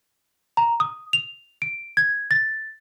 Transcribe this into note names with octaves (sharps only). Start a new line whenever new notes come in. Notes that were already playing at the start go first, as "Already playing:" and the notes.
A#5
D#6
F7
D7
G#6
A6